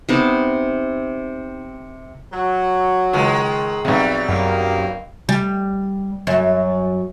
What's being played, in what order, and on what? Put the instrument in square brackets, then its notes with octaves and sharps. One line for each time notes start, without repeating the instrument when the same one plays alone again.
[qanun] C3 B3 D#4 A5
[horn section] F#3
[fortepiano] C#2 [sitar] D#3 G#3
[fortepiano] B1 C3 [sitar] F#3 G3
[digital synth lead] F#2 [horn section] D#3 A#3
[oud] G3
F#2